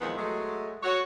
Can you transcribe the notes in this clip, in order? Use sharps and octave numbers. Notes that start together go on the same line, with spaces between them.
E2 A#2 D#3 F3 G#3 B3
F#3 G#3 A3
F#4 C#5